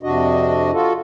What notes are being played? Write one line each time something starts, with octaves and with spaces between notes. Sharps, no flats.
F2 C3 D4 F#4 D#5
F4 F#4 A4